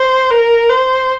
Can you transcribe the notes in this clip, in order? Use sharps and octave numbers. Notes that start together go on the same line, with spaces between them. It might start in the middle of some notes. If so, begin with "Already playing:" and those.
Already playing: C5
A#4
C5